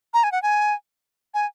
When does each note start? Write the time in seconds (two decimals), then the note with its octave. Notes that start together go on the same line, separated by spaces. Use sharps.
0.14 A#5
0.24 G#5
0.32 F#5
0.42 G#5
1.34 G#5